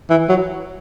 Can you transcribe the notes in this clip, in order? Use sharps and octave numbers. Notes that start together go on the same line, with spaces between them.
E3
F#3